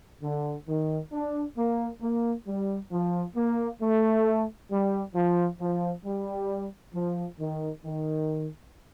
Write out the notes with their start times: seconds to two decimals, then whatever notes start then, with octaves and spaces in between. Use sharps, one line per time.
0.23 D3
0.68 D#3
1.13 D4
1.58 A#3
2.02 A#3
2.48 G3
2.92 F3
3.36 A#3
3.82 A3
4.71 G3
5.15 F3
5.61 F3
6.05 G3
6.94 F3
7.40 D#3
7.85 D#3